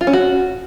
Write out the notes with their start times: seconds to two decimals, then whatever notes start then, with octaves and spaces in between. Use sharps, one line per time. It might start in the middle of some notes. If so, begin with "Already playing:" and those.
0.01 F4
0.07 C#4
0.13 F#4